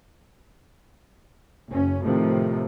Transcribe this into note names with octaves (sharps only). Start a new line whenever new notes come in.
F#1 C#4
A2 C3 D#3 F3